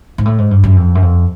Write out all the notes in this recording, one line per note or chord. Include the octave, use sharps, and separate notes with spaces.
G#2
A2
G#2
G2
F#2
F2
F#2
F2